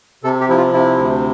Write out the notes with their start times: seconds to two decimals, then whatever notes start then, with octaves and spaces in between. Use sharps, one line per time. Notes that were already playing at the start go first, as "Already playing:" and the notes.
0.24 C3 A4
0.41 G4
0.49 F3 E4
0.57 F4
0.73 C3 E4
0.98 D2